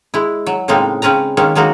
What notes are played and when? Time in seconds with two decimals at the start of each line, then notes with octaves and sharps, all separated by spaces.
0.14 G#3 E4
0.46 F#3
0.68 A2 C#3 G#3 A#3 C4 D#4
1.02 C#3 C4 C#4 B4 A#5
1.37 D#3 G#3 A#3 C#4
1.55 F#3 G#3 A#3 D#4 F#4